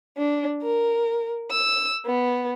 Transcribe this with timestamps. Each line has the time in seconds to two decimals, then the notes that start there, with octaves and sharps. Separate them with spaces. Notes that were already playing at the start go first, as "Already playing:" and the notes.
0.17 D4
0.62 A#4
1.51 E6
2.06 B3